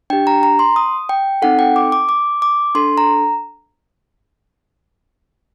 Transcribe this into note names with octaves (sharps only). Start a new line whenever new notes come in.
D4 G4 G5
A#5
A#5
C6
D#6
G5
C4 D#4 A4 F#5
G5
D6
D6
D6
D6
D4 A4 C6
A#5